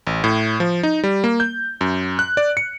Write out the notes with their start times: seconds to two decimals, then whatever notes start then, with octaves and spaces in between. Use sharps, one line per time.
0.07 A1
0.24 A2
0.60 F3
0.83 D#4
1.04 G3
1.24 A#3
1.40 G6
1.81 F#2
2.19 F#6
2.37 D5
2.57 C#7